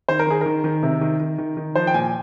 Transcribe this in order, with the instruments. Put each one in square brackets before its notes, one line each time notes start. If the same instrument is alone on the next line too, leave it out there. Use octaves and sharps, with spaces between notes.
[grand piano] D#3 C5
A#4
D#3 G#4
D#3 A#4
D#3
C3
D#3
D#3
D#3
D#3
F3 C5
G5
A#2 G#5